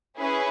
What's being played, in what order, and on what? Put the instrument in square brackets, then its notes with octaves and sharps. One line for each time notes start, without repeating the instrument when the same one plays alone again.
[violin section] C#4 E4 G#4 B4